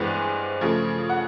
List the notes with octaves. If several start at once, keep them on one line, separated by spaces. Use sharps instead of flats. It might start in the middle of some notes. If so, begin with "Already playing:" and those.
Already playing: G2 E3 G#3 B3 C5
C#3 F3 A3
F#5